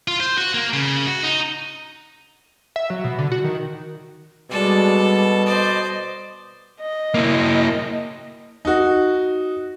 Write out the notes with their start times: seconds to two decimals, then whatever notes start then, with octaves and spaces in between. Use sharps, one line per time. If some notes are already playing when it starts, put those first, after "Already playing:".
0.08 F4
0.20 C5
0.38 F#4
0.54 A#3
0.73 C#3
1.06 F#4
1.23 D#4
2.76 E5
2.90 F#3
3.04 B2
3.18 D3
3.32 F#4
3.44 D#3
4.51 B2 G3 G#3 F#4 A4 D5
5.46 C5 D5 D#5
6.81 D#5
7.14 A#3 E4
8.65 D#4 F#4